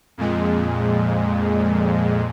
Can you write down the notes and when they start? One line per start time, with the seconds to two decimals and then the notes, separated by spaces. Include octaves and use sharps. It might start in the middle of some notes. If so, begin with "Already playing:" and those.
0.18 F2 A#2 G#3